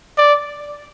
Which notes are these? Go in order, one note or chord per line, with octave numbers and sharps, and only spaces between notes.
D5